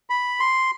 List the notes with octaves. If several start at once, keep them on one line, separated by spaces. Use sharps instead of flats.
B5
C6